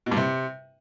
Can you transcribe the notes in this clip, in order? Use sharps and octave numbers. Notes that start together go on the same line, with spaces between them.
B2
G2
C3